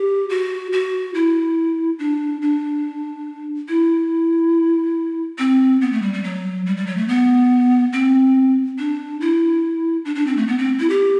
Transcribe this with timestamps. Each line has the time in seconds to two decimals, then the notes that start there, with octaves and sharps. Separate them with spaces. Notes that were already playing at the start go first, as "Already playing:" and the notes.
Already playing: G4
0.30 F#4
0.73 F#4
1.14 E4
1.99 D4
2.42 D4
3.69 E4
5.39 C4
5.81 B3
5.92 A3
6.02 G3
6.13 G3
6.24 F#3
6.66 G3
6.77 G3
6.87 F#3
6.97 A3
7.08 B3
7.93 C4
8.78 D4
9.21 E4
10.05 D4
10.15 D4
10.27 C4
10.37 A3
10.48 B3
10.58 C4
10.80 E4
10.90 G4